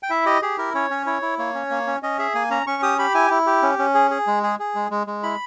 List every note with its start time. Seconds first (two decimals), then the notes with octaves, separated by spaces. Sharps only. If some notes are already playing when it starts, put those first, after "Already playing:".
0.03 G5
0.10 E4 E5
0.26 G4 D#5
0.42 G4 G#4
0.58 E4 A#4
0.75 C#4 C#5
0.90 C#4
1.06 E4 C#5
1.22 E4
1.38 A#3 C#5
1.54 C#4
1.70 A#3
1.87 C#4
2.03 C#4 D#5
2.19 G#4 E5
2.34 A#3 G#5
2.50 C#4 A#5
2.67 C#4 C#6
2.83 G4 D#6
2.99 G4 B5
3.14 E4 G#5
3.30 E4
3.46 G4
3.62 C#4
3.78 C#4
3.94 G#4
4.11 G#4
4.27 G#3
4.43 G#4
4.59 G#4
4.75 G#3
4.91 G#3
5.07 G#3
5.23 E4 B5